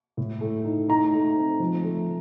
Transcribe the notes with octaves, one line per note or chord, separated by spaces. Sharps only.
A2
A3
D#4
D#4 A#5
A3
C4
F3
A3